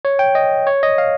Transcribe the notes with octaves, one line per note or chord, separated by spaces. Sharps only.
C#5
G5
D#5
C#5
D#5
F5